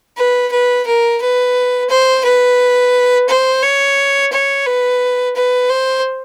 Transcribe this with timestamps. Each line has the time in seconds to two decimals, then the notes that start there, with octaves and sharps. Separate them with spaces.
0.17 B4
0.51 B4
0.86 A#4
1.21 B4
1.90 C5
2.24 B4
3.28 C5
3.62 C#5
4.32 C#5
4.66 B4
5.35 B4
5.70 C5